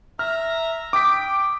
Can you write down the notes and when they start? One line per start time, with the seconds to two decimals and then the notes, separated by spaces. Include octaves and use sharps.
0.19 E5 A#5 F6
0.93 G5 D6 D#6 B6